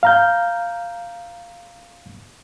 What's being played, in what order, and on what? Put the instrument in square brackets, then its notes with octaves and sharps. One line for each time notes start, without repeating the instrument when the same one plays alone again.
[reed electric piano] F5 A#5 G6